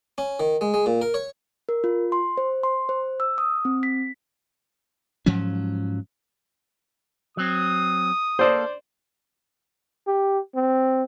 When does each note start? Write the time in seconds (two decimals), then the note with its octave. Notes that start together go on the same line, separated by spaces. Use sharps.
0.18 C#4
0.40 D#3
0.61 G#3
0.74 G#3
0.86 A#2
1.02 A#4
1.14 C#5
1.69 A#4
1.84 F4
2.12 C6
2.37 C5
2.63 C6
2.89 C5
3.20 E6
3.38 D#6
3.65 C4
3.83 B6
5.26 G#2 F3 F#3 C#4
7.37 F#3 C4 D#6
8.39 A#3 A4 C5 D5
10.07 G4
10.55 C4